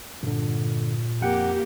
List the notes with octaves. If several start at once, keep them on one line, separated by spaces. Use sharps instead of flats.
G2 A#2 D3
F2 A#3 G4 F#5 G5